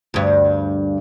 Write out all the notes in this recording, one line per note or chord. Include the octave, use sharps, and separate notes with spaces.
D2 G2